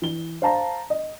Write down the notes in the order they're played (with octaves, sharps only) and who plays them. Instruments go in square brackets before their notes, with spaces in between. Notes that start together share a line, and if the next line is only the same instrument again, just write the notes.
[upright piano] E3 G7
C5 F5 A5 A#5
D#5